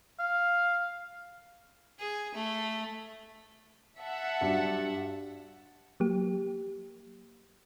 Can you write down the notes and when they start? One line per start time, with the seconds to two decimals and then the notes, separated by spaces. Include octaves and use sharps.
0.19 F5
1.99 G#4
2.34 A3
4.00 E5 F#5 A5
4.41 G2 F#3 D4
6.00 F#3 A#3 G4